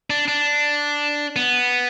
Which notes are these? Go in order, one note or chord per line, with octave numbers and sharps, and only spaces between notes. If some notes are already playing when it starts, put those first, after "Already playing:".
D4
D4
B3